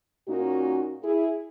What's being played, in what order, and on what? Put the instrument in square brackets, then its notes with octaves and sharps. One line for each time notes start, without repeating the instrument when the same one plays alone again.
[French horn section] A#2 A#3 C#4 D#4 F#4
E4 G#4